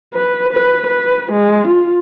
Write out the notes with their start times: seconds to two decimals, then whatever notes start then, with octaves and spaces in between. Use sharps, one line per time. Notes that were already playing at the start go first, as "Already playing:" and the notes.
0.14 B4
0.53 B4
0.86 B4
1.32 G#3
1.67 F4